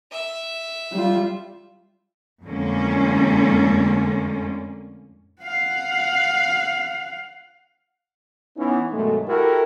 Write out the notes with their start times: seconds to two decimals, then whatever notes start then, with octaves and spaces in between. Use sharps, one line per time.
0.12 E5
0.93 G3 F4
2.44 F2 A2 D3 G#3 A#3 C#4
5.42 F5 F#5
8.57 E3 B3 C#4 D#4
8.93 G2 B2 D#3 F#3 G#3 A3
9.28 E4 F#4 G4 A4 A#4